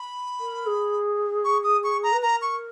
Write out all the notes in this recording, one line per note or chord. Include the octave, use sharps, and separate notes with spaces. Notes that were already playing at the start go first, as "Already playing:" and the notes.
Already playing: B5
A#4
G#4
C#6
D#6
C#6
A#5
B4
A#4 A#5
C#6